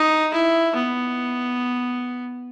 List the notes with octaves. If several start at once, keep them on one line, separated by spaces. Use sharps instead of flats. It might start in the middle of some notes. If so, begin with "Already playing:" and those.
Already playing: D#4
E4
B3